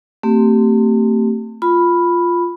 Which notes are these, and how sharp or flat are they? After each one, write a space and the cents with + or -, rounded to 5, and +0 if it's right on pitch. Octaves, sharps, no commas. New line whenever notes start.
A3 +40 C4 +0 G4 -15
F4 +0 B5 +0